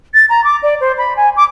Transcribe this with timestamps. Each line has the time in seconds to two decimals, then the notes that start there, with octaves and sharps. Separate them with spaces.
0.14 A6
0.29 A#5
0.44 D6
0.63 D5
0.81 C5
0.98 B5
1.16 G#5
1.36 D6